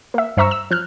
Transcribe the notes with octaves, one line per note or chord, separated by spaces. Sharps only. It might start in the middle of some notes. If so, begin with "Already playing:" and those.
A#3 E5
G2 C5 E5 A#5 C#6 E6
E6
F3 F6 F#6